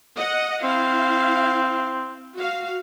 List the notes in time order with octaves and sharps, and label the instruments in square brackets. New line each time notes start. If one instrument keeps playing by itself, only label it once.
[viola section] D#5 F#5
[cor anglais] C4 [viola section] E4 F5
[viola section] F#4 F5